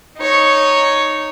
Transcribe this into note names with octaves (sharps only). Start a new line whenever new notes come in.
D#4 C#5